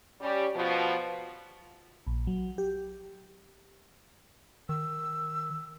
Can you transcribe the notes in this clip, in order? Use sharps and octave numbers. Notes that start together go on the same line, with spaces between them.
G3 C#4 G4
B2 F3
A#1
F#3
G4
D#3 E6